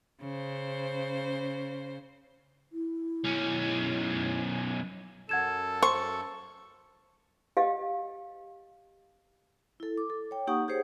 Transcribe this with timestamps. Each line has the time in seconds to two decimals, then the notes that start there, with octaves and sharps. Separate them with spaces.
0.21 C#3 C5
2.73 E4
3.24 B1 C#4
5.29 F#2 A4 F#5 G#6 E7
5.83 C5 C#6
7.57 G4 D#5 F5
9.80 E4 A4
9.98 D6
10.10 A4
10.31 C#5 G5
10.47 A#3 D#4 G4 F#5 C#6 D#6
10.68 G4 G#4 C5 C#5